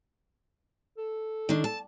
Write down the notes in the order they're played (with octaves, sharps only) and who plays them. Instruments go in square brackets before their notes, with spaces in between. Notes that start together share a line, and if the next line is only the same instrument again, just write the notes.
[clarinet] A4
[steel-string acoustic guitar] D#3 D4
A5